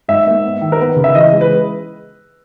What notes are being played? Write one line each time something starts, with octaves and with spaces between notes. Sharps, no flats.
G#2 E5
A#3
B3
D#3
A#4
B3 B4
C#3
E5
E3 D#5
G#3
B4